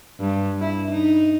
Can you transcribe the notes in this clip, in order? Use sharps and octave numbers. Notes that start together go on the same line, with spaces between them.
G2
E4
D#4